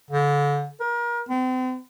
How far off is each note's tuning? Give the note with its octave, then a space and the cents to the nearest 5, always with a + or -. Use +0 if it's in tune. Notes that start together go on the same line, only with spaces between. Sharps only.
D3 -30
A#4 +35
C4 -40